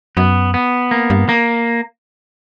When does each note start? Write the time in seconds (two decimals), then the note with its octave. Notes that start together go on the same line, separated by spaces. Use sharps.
0.17 F#2 B3
0.54 B3
0.91 A#3
1.10 G2
1.29 A#3